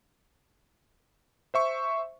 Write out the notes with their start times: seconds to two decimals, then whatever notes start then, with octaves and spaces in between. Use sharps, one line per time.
1.54 C5 E5 C#6